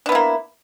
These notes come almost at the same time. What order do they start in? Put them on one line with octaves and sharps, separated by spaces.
D4 B3 E4 A#3